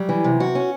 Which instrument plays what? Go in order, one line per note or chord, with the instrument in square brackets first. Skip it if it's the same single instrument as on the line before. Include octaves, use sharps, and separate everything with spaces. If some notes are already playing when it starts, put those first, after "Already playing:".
Already playing: [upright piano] F#3 [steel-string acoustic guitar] G3
[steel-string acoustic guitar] E3
C3
F#4
C#4